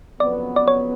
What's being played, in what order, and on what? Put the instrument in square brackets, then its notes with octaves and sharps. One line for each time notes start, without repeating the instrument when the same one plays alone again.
[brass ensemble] F#1 F2 C#3 F#3 B3 [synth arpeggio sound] D5
[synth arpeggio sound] D5
C#5